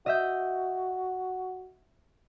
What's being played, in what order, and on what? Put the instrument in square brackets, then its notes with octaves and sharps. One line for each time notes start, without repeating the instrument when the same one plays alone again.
[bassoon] F#4 [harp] D#5 E5 G6